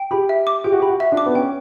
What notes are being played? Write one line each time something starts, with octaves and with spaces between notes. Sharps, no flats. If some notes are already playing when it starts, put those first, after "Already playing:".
Already playing: G5
G4 B5
E5
D6
G4 G5
F#4
G4 B5
F#4
E5
D4
D6
B3
C#4 G5